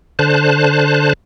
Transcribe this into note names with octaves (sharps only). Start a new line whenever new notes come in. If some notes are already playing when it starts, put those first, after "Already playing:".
D3 C5 A5 F#6